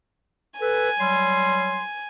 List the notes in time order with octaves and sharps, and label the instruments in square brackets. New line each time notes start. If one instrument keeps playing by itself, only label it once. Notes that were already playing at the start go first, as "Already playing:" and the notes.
[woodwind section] A4 B4 [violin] G#5
[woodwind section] F#3 G3 C6